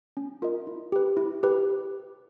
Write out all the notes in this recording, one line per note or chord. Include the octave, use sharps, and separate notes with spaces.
C#4
F4 A#4 D#5
E4
G4 B4
E4
G4 B4